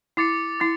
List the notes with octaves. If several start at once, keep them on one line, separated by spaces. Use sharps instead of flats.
E4 D6 A6 C#7
E4 D6 A6